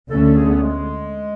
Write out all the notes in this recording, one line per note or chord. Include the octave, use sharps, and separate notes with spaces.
D2 D3 A3 C#4 A4
A4
G#4
B3
G#3